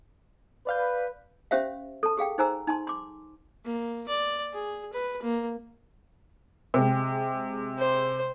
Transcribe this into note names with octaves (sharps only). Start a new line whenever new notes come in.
B4 D5 F5 G6
C#4 G4 C5 E5 F5
A4 A5
G4 G#4 F5 G5
D#4 G#4 C5 G#5 A#5 E6
D#4 G#5 A5 C6
C6 D6
A#3
D5
G#4
B4
A#3
C3 G#3
C5